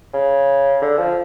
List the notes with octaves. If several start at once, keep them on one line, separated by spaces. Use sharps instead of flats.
C#3
D3
F3